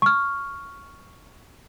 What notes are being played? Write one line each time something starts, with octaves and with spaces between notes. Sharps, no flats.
C#6 F6